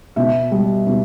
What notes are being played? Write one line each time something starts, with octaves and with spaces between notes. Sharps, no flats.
B2 E5
G3
B2